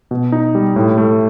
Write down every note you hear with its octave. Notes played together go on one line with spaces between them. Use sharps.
B2
D#4
G3
A2
A3